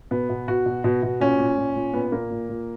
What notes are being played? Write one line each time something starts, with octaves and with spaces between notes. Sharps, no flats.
B2 B3
B2
B2 F#4
B2
B2
B2
A#2 C#4
A#2
A#2
A#2
A#2 B3
A#2 A#3
A#2
A#2